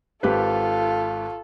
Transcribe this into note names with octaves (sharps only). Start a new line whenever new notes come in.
G#1 F4 G4 A4 B4